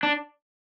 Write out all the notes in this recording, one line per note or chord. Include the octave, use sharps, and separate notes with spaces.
D4